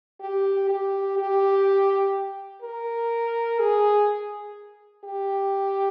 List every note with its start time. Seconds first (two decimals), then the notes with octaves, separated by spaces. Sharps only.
0.21 G4
0.69 G4
1.18 G4
2.62 A#4
3.59 G#4
5.05 G4